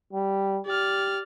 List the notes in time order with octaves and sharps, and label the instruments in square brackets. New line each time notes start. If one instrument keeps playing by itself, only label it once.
[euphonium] G3
[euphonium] G4 [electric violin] D5 F6